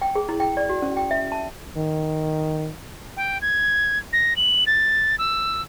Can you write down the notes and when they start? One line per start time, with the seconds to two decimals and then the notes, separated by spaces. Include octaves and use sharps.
0.01 G5
0.16 G#4
0.29 E4
0.40 G5
0.57 D5
0.69 F#4
0.82 C#4
0.96 G5
1.11 E5
1.32 A5
1.76 D#3
3.17 G5
3.42 G#6
4.13 A#6
4.36 F#7
4.67 A6
5.19 E6